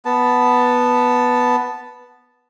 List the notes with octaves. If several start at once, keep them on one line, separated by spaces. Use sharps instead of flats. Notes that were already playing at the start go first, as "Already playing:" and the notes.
B3 A5